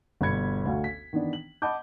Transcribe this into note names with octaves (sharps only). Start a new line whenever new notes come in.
G1 B2 B5 G#6 C#7
D2 F#4 F5
B6
D#3 E3 B3 D4
F#7
D#5 F#5 A5 B5 D6 G6